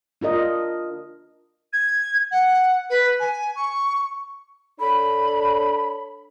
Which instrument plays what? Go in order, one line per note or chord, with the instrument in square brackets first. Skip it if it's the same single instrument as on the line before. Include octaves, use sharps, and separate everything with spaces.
[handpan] D4 F4 A#4 D#5
[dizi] G#6
F#5
B4
G#5
C#6
[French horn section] D4 A4 C#5 [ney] B5